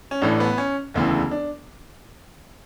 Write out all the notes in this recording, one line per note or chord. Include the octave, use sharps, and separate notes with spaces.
C#4
A1 A2 E3 D4
B3
C#4
E1 D2 C#3 E3
D4